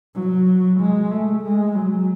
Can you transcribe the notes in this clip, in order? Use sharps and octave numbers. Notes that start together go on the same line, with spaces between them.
F#3
G#3
A3
G#3
F#3